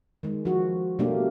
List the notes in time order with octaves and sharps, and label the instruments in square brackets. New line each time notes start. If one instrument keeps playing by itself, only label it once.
[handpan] D#3 G#3
F3 F#4
B2 G3 A3 A#3 D4 G4